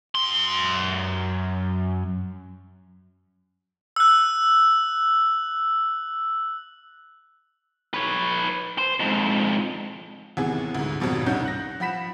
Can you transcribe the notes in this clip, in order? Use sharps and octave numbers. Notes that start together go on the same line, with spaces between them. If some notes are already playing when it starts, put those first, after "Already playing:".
F#2 C6
E6 F#6
B4 C#5
C5
F2 G#2
D#2 C3 E3 B3 G#4 F#5
D2 G#2
G#1 F2 B2 F3
C2 G2 D#4 C#5 F#5 G6
F#6 A#6
F3 F#5 B5 B6 E7